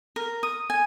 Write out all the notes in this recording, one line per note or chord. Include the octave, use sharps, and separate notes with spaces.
A#4
D#6
G#5